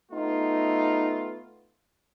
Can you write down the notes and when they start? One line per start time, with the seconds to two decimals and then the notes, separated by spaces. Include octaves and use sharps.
0.12 A3 B3 D#4 F4